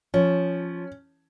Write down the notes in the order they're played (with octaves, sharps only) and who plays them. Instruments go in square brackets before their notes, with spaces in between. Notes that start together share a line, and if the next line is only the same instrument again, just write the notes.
[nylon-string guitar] F3 [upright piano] C#4